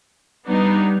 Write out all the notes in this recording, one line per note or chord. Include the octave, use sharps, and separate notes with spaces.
G3 B3 D4 D#4